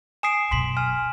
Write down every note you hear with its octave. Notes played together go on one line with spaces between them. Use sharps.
G#5 D#6 C7 D7 E7
F#2 B2 C6 B6 F#7
G#5 F6